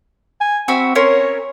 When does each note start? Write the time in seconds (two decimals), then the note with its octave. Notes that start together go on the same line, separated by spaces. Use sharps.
0.41 G#5
0.68 C4 F#4 E5 B5
0.95 C#4 A#4 C#5 C6